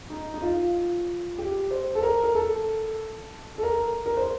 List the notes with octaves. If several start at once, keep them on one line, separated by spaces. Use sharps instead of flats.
D#4
D#4
F4
G4
C5
A4
A#4
A#4
A4
A4
A#4
A#4
C5